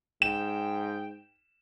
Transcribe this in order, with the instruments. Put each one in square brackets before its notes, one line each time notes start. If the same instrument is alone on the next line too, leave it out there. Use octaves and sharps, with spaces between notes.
[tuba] G#2 [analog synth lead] G5 [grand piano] E7